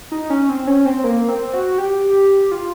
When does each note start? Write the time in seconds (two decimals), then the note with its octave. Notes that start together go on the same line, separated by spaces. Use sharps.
0.12 D#4
0.30 C#4
0.49 C4
0.67 C#4
0.85 C4
1.04 A#3
1.29 C4
1.53 F#4
1.78 G4
2.51 F4